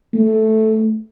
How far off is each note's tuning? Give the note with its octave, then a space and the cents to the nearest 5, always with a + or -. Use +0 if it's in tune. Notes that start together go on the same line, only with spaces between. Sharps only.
A3 -5